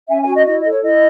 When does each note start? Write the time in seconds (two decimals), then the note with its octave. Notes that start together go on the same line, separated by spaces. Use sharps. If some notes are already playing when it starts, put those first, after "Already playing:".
0.09 C#4 E5 G#5
0.21 E5 G#5
0.27 F#4
0.33 D#5
0.45 E4 D#5
0.58 D#5
0.64 A4
0.70 C#5
0.82 E4 D#5